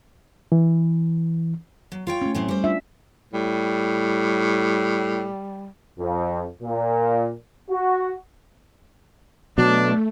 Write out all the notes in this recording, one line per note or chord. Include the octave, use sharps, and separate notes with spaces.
E3
F#3
F4 C#5 G5
A3 C#4
A2 F#3 C4
G3 C5
D4 F4 E5
A2 G3
F2
A#2
F#4
B2 F#3 A3 D4